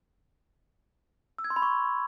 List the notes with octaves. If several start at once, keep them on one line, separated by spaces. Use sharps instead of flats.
E6
G#6
C6
B5
C#6